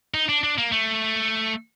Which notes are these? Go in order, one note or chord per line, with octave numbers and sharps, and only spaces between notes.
D#4
D4
D4
A#3
A3